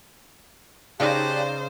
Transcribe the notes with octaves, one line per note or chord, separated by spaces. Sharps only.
C#3 D#4 G4 C5 D5 F5 A5 F#6